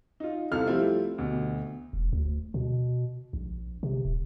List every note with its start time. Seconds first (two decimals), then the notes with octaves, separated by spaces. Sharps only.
0.20 D#4 F4
0.51 C2 C3 A4 F5 F6
0.67 F3 G3 A3 C4 E4
1.18 D2 B2
1.93 E1
2.13 D2
2.54 B2
3.33 A#1
3.83 C3
4.05 D1